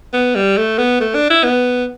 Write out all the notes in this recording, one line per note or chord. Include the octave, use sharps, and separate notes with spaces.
B3
G3
A3
B3
A3
D4
E4
B3